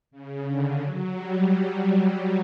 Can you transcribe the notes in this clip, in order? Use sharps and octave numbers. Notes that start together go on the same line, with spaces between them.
C#3
D3
F#3
G3